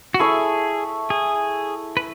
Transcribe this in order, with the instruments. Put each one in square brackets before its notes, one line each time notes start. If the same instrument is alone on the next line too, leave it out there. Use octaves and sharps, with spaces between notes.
[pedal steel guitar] F#4
[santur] E4 A4 C#5 E5 [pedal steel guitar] G#4
[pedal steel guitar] G#4
B4